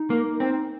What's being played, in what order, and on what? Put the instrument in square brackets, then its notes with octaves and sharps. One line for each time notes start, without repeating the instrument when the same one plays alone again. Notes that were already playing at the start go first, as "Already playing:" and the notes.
Already playing: [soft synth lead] D#4
[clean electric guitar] A#3
C4